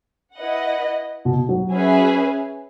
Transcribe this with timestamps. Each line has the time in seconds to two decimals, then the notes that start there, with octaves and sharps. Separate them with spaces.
0.36 E4 B4 D#5 F#5
1.25 B2
1.49 F#3
1.70 C#4 G#4 B4 E5 G#5